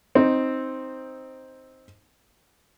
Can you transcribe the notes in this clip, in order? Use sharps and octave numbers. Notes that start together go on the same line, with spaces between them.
C4 D#4